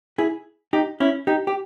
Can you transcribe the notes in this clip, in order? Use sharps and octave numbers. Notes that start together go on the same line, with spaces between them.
E4 G#4
D#4 G4
C#4 E4
D#4 G4
G4